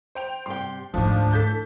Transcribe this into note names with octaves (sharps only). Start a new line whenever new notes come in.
C5 G5 F7
G2 C3 G5 C6
D2 G#2 D#3 F3 A3 D4
E3 A3 A4 A5 G6 B6